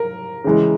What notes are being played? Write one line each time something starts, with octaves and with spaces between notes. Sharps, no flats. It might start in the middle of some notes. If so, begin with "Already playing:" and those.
Already playing: A#4
C#3 E3 G#3